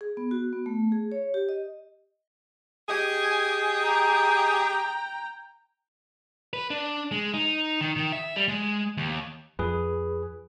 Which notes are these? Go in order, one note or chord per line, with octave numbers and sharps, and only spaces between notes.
G#4
B3
F#4
B3
A3
G#4
C#5
G4
D#5
G4 G#4 D#5 G#5
G5 A#5
B4
D4
G#3
D#4
D#3
D#3
E5
G3
G#3
D#2
F2 G#4 B4